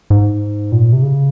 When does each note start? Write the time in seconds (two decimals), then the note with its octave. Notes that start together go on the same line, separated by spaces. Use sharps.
0.10 G#2
0.72 A#2
0.93 C3
1.03 C#3